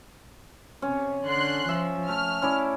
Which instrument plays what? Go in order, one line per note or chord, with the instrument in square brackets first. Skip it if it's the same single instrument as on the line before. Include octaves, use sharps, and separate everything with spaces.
[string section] C3 [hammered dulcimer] C#4
[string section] D3 C6 F#6
[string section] F3 [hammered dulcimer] E5
[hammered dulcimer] A3 [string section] F6
[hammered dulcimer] C#4 E4 D5